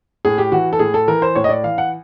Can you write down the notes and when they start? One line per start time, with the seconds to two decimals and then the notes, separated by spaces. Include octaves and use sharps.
0.25 A2 G#4
0.38 G4
0.52 E3 F#4
0.73 A4
0.79 A2 G#4
0.94 A4
1.08 E3 A#4
1.22 C5
1.35 A2 C#5
1.44 D#5
1.49 D5
1.64 E3 F5
1.78 F#5